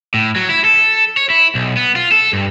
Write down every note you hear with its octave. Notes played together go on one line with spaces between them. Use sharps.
A2
F#3
E4
A4
C#5
E4
B1
B3
F4
A4
G2